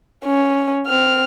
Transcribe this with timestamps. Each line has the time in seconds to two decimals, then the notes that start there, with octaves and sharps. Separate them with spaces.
0.25 C#4
0.87 C4 F6